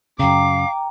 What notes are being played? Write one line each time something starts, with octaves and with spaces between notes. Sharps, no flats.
F#2 C#3 F5 G5 A#5 D6